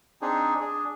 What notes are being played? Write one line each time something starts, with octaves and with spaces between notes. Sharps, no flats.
C4 D4 D#4 G#4
D4 G#4